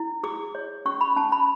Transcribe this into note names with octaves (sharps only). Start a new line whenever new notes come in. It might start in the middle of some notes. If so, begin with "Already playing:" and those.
Already playing: E4
G#4 D6
C#5
C#4 C#6
B5
C#4 A5
B5